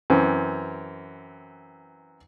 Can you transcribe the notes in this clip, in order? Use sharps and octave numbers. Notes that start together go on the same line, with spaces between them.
F#2 E3 C4